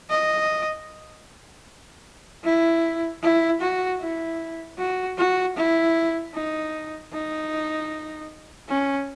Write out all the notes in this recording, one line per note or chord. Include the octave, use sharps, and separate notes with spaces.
D#5
E4
E4
F#4
E4
F#4
F#4
E4
D#4
D#4
C#4